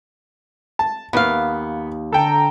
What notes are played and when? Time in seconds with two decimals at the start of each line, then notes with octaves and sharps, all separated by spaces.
0.79 A5
1.13 D#2 B3 F5
2.13 D3 A4 G5 A#5